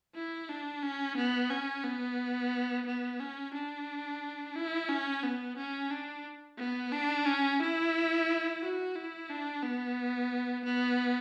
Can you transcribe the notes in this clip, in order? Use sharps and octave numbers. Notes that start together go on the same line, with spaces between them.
E4
D4
C#4
B3
C#4
B3
B3
C#4
D4
E4
C#4
B3
C#4
D4
B3
D4
C#4
E4
F#4
E4
D4
B3
B3